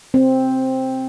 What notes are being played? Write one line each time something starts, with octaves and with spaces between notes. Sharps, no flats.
C4